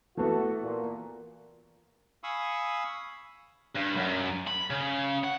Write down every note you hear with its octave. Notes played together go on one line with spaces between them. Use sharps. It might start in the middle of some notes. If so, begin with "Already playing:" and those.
E3 A3 B3 F#4 A4
A#2
F5 G#5 B5 C#6 D#6 E6
G2
F#2
B5
C#3
F#5